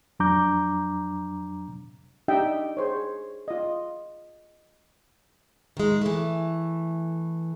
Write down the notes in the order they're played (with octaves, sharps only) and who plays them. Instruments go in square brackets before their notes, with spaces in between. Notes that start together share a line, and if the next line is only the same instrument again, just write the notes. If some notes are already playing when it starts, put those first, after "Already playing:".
[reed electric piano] F2 F#3 D4 A#5 D6 G6
[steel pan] D4 D#4 G4 D#5 E5 G5
G#4 C5 C#5
F4 D#5
[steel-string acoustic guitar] D#3 G#3
E3 A3